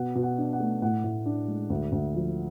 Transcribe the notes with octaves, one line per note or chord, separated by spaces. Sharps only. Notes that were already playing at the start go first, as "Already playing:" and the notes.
Already playing: B2 F#5
B2
F#5
D4
F#5
A3
A2 F#5
A2
D4
G#3
D2
D2
F3